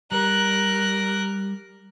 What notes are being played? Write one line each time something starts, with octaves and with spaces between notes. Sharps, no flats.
G3 A#4 F#6